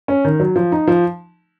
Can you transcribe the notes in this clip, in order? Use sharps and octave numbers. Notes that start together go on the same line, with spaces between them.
C#4
D#3
F#3
F3
D#4
F3